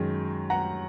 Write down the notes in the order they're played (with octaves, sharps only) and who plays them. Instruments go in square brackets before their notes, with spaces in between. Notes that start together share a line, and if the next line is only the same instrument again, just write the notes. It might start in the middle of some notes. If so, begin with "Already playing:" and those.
Already playing: [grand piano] F#2 D#3 G#3
F#5 A#5